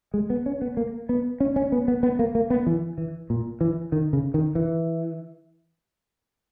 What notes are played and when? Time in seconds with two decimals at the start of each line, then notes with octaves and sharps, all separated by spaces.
0.14 G#3
0.30 B3
0.46 C#4
0.62 B3
0.77 A#3
1.09 B3
1.40 C#4
1.56 C#4
1.72 B3
1.88 B3
2.03 B3
2.19 A#3
2.35 A#3
2.50 B3
2.67 E3
2.98 E3
3.30 A#2
3.61 E3
3.92 D#3
4.13 C#3
4.34 D#3
4.55 E3